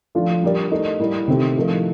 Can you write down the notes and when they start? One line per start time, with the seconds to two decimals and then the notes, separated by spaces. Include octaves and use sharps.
0.15 F3 A3 D4 F4
0.43 G3 D4 G4 A#4 D5
0.71 A3 D#4 A#4 D#5
0.99 A2 G3 A#3
1.28 C3 D#3 A3 C4 G4
1.56 A2 F3 A3 D#4 A#4